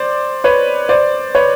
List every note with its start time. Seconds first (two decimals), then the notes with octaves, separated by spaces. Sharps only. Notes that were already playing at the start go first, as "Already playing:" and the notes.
Already playing: C5 D5
0.44 B4 C#5
0.89 C5 D5
1.35 B4 C#5